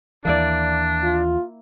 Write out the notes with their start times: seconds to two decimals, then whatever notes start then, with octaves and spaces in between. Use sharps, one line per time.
0.25 D#2 E3 A#3 D4 E4 D5
1.03 F4